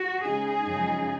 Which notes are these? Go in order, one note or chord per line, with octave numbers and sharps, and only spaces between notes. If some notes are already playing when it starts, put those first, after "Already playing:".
Already playing: F#4
C#3 G#3 D#4 G#4
F#2 C#3 F3 G#3 D#4